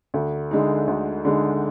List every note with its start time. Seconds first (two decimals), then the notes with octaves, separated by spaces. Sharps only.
0.14 D2
0.51 D3 G#3 D#4
0.88 D2
1.25 D3 G#3 D#4